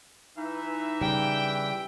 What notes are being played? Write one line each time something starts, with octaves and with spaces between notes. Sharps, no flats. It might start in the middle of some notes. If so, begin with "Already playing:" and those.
E3 D#4 E5
C#3 G3 F5 G5